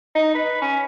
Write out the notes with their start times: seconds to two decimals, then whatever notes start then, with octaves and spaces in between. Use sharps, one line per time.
0.15 D#4
0.35 B4
0.61 C#4